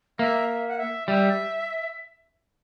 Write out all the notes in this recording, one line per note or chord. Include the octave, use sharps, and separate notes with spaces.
A#3 E5
E5
F#5
E5
G3 E5